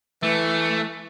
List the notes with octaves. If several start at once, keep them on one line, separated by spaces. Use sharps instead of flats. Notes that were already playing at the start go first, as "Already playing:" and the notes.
E3 A3